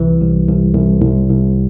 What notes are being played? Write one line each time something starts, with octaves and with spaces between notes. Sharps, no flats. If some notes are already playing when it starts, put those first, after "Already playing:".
Already playing: C2 C3 E3
C2
C2
C2
C2
C2